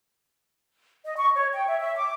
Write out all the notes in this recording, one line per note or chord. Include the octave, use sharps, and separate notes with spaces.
D#5
C#6
C#5
G5
E5
E5
D6